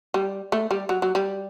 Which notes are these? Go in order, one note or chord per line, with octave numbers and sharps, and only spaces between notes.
G3
A3
G3
F#3
F#3
G3